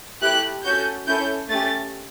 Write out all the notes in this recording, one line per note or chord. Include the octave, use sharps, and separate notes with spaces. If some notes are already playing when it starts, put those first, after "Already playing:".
A3 E4 G4 F#6
C#4 F#4 A4 G6
C#4 E4 A4 G6
A3 C#4 G4 A6